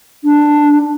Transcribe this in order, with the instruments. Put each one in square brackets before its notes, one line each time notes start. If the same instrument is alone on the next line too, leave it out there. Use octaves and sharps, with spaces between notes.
[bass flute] D4